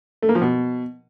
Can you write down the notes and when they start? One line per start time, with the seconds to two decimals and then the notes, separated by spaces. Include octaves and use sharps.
0.22 A3
0.29 A#3
0.35 F3
0.42 B2